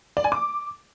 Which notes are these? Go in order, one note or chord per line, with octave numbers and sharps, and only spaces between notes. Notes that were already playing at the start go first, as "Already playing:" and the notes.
D5
G#5
D6